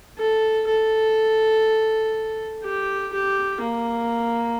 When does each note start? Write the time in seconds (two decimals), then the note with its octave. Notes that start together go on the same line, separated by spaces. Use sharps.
0.18 A4
0.68 A4
2.64 G4
3.13 G4
3.61 A#3